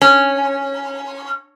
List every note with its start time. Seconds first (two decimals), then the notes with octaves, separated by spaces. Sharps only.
0.01 C#4